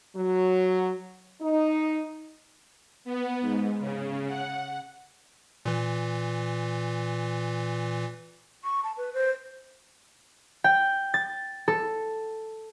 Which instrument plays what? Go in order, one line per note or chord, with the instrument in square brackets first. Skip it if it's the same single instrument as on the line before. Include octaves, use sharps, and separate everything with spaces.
[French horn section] F#3
D#4
[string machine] B3
G#2
C#3
F#5
[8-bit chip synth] A#2 E3
[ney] C#6
A5
B4
C5
[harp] G5
A6
A4